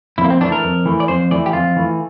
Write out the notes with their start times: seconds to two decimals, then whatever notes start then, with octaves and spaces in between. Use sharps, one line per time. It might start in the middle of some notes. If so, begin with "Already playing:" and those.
0.18 F2 E4
0.24 A#3
0.30 C4
0.41 E3 A3 D4
0.52 A#4
0.64 F2
0.85 E3 A3
1.00 D5
1.08 F2 C5
1.31 E3 A3 D5
1.46 G4
1.53 F2 F4
1.76 E3 A3